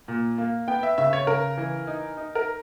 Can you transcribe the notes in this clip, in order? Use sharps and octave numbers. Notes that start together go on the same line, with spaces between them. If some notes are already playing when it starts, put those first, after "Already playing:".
A#2
A#3
B3 G5
E5
C#3 E5
C#5
C#3 A#4
E3
D#4
D#4
A#4